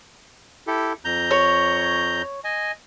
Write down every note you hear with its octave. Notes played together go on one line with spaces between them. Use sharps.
E4 G4 A4
F2 A#5 G6
C#5
D#5 G#5